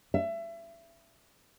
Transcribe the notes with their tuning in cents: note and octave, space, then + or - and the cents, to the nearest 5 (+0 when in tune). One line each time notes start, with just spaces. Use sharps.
E5 +25